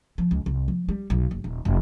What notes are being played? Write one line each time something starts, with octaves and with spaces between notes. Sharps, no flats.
F3
C#2
C2
F3
G3
B1
F#1
D#1
F1